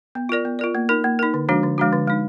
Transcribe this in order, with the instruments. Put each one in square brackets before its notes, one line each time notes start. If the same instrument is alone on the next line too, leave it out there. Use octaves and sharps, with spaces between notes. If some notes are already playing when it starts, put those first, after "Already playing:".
[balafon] B3
F4 A#4 D5
B3
F4 A#4 D5
A#3
D#4 A#4
A#3
D#4 A#4
D3
F3 G#3 D4 F#4
D3
F3 G#3 D4 F#4
D3
G#3 D#4